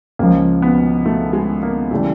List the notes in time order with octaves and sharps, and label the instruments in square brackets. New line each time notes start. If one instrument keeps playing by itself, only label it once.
[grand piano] C#2 C#3 F3 [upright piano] A#3
[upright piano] B3
A3
G#3
A#3
[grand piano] C#3 E3 G3 [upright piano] A3